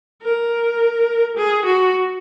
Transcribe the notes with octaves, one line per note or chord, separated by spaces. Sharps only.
A#4
G#4
F#4